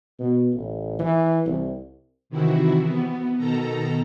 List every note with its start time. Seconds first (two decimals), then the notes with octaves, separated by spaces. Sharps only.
0.19 B2
0.54 A1
0.99 E3
1.46 C2
2.30 C3 D#3 E3 E4 F#4
2.84 B3
3.37 B2 D#3 A4 A#5